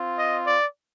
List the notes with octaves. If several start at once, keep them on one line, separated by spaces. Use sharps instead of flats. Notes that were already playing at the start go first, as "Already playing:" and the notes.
Already playing: C4 F4
D#5
D5